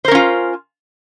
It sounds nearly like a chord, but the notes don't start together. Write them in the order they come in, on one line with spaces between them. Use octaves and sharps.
C5 A#4 C#4 F4